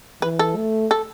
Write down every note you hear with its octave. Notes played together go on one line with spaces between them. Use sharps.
E3 B4
A4
A3
A4